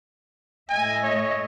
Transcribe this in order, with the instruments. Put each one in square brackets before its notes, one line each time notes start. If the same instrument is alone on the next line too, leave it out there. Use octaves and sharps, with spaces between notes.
[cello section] A2 D#5 E5 [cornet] G#5
[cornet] C#5